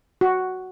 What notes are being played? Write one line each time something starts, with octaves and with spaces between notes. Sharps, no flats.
F#4